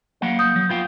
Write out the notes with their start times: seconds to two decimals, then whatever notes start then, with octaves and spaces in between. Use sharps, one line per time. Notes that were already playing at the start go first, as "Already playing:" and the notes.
0.22 F#3 A#3 F#5
0.39 D#6 G6
0.56 F#3
0.69 B3 F4 G5